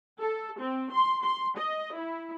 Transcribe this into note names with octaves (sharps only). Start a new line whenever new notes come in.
A4
C4
C6
C6
D#5
E4